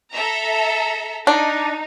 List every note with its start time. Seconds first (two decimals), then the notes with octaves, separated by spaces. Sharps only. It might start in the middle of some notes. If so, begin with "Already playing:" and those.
0.14 A4 E5 A#5
1.27 D4 D#4